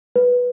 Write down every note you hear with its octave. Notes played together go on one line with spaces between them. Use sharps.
B4